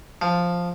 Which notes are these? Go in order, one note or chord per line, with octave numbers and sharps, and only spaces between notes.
F3